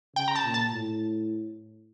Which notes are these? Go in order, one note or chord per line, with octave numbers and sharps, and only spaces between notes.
C#3 G5
A#5
A5
A#2
A5
A2